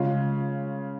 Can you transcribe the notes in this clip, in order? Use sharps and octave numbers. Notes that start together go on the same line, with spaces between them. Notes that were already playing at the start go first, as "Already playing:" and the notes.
Already playing: C#3 G#3 F4